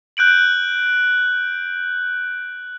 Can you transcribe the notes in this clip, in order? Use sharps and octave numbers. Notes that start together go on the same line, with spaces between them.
F#6 G6 D7 F#7